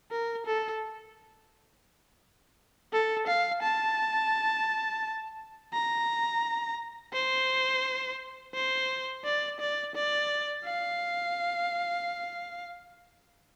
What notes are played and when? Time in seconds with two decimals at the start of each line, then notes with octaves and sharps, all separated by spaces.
0.11 A#4
0.46 A4
2.92 A4
3.27 F5
3.62 A5
5.74 A#5
7.13 C5
8.54 C5
9.24 D5
9.60 D5
9.95 D5
10.65 F5